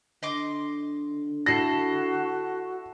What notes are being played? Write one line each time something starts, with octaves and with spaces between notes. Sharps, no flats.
D3 D#5 C6 D6
E4 F#4 A4 A#6 C7